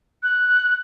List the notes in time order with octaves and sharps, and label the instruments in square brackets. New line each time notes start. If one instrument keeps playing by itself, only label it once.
[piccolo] F#6